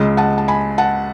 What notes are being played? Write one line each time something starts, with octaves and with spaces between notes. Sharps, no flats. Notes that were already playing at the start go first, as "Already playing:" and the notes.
Already playing: C#2 C#3 G#3
F#5 A5
A5
G#5 B5
F#5 A5